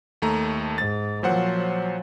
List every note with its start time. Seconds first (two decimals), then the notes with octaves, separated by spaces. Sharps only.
0.22 D#2 A3 A#5
0.78 G#2 A6
1.23 A#2 F3 F#3 C5 F#5